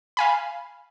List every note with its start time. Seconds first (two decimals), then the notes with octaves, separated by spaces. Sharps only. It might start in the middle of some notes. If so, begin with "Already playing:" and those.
0.17 F5 G#5 B5